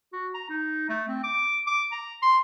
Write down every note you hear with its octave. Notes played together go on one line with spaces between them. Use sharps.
F#4
A#5
D#4
A3
C4
D6
D6
A#5
C6